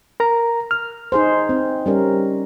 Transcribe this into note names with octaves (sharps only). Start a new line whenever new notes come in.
A#4 A#5
F6
D#4 G#4 C5
C4
G3 C#4 A#4